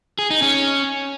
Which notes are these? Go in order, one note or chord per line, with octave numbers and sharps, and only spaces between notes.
G#4
D#4
C#4